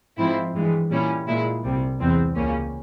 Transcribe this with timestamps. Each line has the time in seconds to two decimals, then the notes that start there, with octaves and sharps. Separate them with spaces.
0.18 G#2 F3 C4 E4
0.54 G2 E3 G#3
0.91 A#2 G3 C#4 E4
1.27 A#2 G#3 E4
1.63 C2 C3 G3
1.99 E2 E3 G#3 C4
2.35 C#2 C#3 G3 A#3 C#4